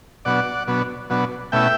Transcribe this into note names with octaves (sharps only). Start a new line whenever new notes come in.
B2 F#3 B3 D4 D5 F#5
B2 F#3 B3 D4
B2 F#3 B3 D4
B2 A3 C#4 E4 E5 G5